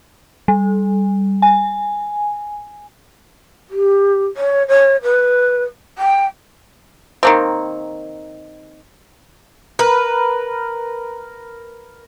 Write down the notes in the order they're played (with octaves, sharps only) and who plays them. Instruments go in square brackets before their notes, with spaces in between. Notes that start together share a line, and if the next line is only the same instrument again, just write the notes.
[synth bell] G3
G#5
[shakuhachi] G4
C#5
C#5
B4
G5
[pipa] D#3 A#3 C4
[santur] A#4 [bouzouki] B4